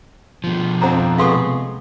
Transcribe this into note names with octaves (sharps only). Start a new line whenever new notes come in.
B2 F3
F2 C4 F#5 A#5
C3 G#3 B3 G#4 A4 F5 C6 C#6